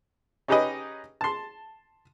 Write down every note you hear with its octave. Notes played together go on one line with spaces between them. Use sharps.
C#4 D#4 G4 G#4 B4 D#5
A5 C6